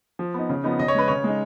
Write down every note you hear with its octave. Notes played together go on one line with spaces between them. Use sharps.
F3
B3 D#4
C#3
F3 B3 D#4
C#3 D#5
C#5
G#3 C#4 B4
C#3 C#5
G#3 D#4